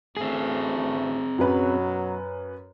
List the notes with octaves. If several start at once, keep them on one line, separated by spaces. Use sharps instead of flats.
A1 D2 A3 C4 G#4 C7
F#2 B2 F#3 C#4 B4